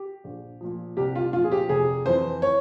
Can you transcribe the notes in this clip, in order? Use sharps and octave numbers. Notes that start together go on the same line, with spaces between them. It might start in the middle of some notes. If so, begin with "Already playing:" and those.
Already playing: G4
A#1
A#2 F3
C2 G4
F4
A#2 F3 F4
G#4
G4
F1 G#4
F2 E3 C5
C#5